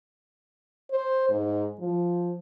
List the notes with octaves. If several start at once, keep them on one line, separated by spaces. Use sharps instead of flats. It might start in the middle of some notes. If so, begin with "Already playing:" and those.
C5
G#2
F3